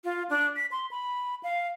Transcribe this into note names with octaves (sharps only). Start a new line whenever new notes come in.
F4
D4
B6
C6
B5
F5